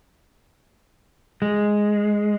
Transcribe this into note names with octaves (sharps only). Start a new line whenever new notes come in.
G#3